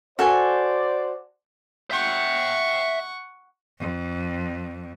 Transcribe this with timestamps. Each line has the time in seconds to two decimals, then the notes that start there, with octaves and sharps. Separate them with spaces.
0.19 F#4 A4 C5 D5 G#5
1.91 E5 F#5 G5 C#6
3.79 F2